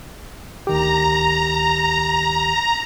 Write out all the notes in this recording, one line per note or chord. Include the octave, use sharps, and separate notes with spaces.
D2 D#3 G4 A#5